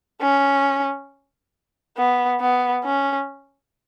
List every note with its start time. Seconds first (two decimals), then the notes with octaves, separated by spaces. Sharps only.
0.21 C#4
1.97 B3
2.41 B3
2.84 C#4